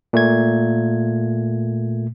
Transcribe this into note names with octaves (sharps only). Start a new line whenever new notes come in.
A#2 A3 G#6